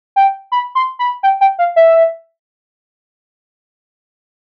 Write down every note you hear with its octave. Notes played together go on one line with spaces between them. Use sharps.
G5
B5
C6
B5
G5
G5
F5
E5